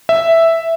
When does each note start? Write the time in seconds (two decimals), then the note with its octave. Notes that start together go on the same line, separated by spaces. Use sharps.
0.09 E5